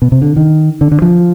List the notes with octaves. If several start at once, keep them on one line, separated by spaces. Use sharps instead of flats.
B2
C3
D3
D#3
D3
D3
F3